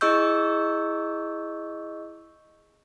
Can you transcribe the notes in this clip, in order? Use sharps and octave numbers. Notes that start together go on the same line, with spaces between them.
E4 G#4 D#5 C#6 E6 G6